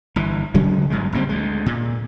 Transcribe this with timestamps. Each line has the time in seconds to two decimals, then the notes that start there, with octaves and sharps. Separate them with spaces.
0.16 G1 E3
0.54 C#3 F#3 G#3 C#4
0.90 G1 G#2 F#3 G#3
1.13 F#1 A#2 G3 C4
1.29 D2 G#3
1.66 A#2